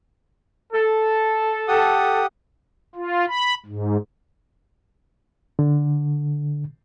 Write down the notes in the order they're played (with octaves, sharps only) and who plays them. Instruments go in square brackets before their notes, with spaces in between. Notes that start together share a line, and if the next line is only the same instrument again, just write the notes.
[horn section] A4
[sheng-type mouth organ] G4 F#5 D#6
[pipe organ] F4
B5
G#2
[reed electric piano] D3